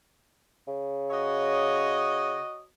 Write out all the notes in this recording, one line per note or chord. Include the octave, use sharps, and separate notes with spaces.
C#3
F#4 C#5 D#5